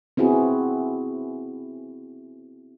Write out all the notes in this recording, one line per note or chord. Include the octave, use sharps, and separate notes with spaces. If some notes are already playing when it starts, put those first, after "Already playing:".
B3 C4 E4 F#4 G#4